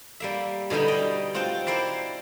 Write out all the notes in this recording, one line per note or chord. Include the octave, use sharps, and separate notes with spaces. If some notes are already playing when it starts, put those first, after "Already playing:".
G3 A#3 E5
B2 D3 G3 D#4 E4
D#5 G5
C4 F4 F#5 G5 A5
E4 A#4 C5 D5 E5